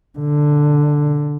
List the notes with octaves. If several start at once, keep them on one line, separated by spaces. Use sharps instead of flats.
D3